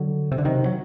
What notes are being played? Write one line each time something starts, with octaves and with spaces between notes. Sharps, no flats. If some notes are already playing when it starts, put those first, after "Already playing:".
Already playing: D3 F#3
C3
D3
C3 D#3
F#3